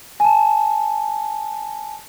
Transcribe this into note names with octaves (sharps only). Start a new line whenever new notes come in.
G#5 A5